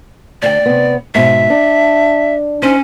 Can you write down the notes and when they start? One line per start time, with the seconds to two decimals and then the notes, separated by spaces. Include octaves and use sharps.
0.42 D2 D5 G5
0.66 C3 B3
1.15 G#2 B2 E5
1.50 D4
2.62 C#4 D#4 C5